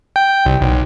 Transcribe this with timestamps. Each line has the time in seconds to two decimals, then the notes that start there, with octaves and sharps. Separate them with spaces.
0.16 G5
0.46 C2
0.61 B1